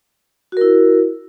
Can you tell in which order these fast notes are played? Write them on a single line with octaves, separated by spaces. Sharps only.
F#4 A#4 E4